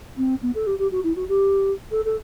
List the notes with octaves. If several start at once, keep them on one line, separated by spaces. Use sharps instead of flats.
C4
B3
A4
G4
G4
F#4
E4
F#4
G4
A4
A4